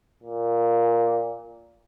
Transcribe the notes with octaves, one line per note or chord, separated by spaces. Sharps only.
A#2